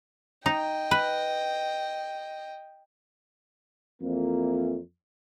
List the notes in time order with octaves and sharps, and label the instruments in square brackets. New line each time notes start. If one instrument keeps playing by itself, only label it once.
[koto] D#4 [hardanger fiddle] D#5 G5
[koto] B4
[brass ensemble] F2 E3 A#3